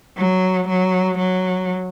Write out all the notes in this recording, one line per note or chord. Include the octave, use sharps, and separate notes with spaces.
F#3
F#3
F#3